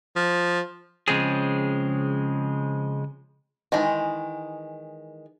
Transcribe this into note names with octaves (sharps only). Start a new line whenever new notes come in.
F3
C#3 F3 G#3 C4 C#4 G#4
D#3 E3 G#3